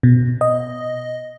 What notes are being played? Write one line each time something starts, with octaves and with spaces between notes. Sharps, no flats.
B2
D#5